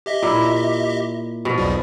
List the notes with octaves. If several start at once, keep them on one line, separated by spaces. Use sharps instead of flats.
G4 D#5 E5
A#2 E4
B2 F3
B1 E2 G3